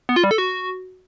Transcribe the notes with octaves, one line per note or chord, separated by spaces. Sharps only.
B3
F4
G3
A4
F#4